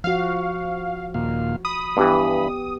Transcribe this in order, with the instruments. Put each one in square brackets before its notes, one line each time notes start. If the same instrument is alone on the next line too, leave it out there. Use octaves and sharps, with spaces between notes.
[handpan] F3 F#4 [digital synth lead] F5
[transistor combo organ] D#2 A#2 F5
[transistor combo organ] B5 [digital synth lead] D#6
[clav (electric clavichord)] G2 E3 [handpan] B3 G4